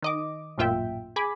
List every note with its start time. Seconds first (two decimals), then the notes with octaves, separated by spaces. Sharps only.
0.02 D#3 D#5 D6
0.58 A1 F#2 A#2 F4 E5 G5
1.16 G#4 G#5 B5 D6